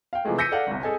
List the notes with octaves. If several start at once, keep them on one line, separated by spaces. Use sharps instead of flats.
F5 G5
C3 E3 F3 G#3 A3
E6 G6 A#6 B6 C#7 D#7
A4 D5 F5 F#5
G1 C2
G#4 A4 D#5 G#5